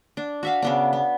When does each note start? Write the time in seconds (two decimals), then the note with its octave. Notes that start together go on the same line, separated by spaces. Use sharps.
0.17 D4
0.43 F#4 E5 F5
0.62 C#3 B3 D4
0.93 B3